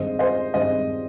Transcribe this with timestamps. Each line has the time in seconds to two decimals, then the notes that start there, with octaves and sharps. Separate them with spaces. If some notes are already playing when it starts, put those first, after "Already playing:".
Already playing: G2 D#3 G#3 C4 C5 D#5
0.19 C5 D#5
0.54 G2 D#3 G#3 C4 C5 D#5